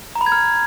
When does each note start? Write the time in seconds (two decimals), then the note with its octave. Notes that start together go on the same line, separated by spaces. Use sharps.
0.15 A#5
0.21 B5
0.26 G#6
0.32 F6